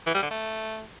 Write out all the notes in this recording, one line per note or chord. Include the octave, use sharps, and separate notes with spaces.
E3
G3
D3
A3